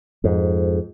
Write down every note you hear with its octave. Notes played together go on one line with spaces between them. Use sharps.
F2 G#2